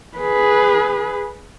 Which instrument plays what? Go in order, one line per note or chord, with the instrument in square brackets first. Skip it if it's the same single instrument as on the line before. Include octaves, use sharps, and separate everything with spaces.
[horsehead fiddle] G#4 B4